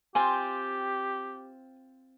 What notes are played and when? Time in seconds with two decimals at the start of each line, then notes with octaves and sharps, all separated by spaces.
0.15 C4 F4 G4 G#5